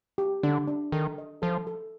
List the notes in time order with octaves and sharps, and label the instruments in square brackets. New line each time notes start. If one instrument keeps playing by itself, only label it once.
[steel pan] G4
[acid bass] D3 [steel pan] D4
[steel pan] D4
[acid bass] D#3 [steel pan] A4
[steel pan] D#5
[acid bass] F3 [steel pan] A4
[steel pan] A4